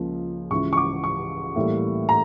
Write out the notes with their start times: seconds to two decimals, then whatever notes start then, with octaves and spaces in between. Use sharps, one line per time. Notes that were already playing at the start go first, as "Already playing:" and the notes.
Already playing: C#2 C#3 F3 A#3
0.51 C#2 C#3 E3 C#6
0.73 C#6
0.77 D6
1.04 C#6
1.56 A2 E3 G3 A#3
2.09 A#5